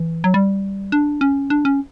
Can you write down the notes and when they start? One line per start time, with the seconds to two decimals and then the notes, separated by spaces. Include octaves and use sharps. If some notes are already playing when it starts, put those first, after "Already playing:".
Already playing: E3
0.24 F#3
0.34 G3
0.92 D4
1.21 C#4
1.50 D4
1.65 C#4